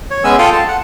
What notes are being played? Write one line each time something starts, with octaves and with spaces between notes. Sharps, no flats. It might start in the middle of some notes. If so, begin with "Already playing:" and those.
C#5
G#3 B3 C#4 G#5 E6
F4 A4 F5 G5 C6 D#6
A5
F#5